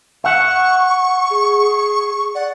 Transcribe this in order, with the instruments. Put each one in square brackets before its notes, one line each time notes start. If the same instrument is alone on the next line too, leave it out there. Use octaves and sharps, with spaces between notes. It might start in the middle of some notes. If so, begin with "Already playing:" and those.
[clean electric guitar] E5 F#5 [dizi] C#6
[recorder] G#4
[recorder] D5 [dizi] F#5